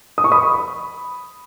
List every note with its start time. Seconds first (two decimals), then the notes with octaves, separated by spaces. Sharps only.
0.18 D#6
0.24 C#6
0.32 B5 D#6